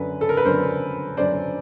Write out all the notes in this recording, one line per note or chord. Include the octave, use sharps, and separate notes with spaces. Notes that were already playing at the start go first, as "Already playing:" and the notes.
Already playing: F#2 D3 B4
A4
A#4
B4
F#2 D3 A#4 C5
F#2 D3 C5 D5